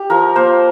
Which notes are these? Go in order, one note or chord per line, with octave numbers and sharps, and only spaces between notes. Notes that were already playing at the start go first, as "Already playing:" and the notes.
Already playing: G4
F3 A#4
A#3 C5